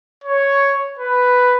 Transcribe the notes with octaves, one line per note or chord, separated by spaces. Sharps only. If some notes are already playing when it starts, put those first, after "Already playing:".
C#5
B4